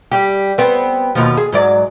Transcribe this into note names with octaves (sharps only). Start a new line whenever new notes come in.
G3 G4
B3 C4
D#2 B2 F3
G#4
G#2 F#3 D5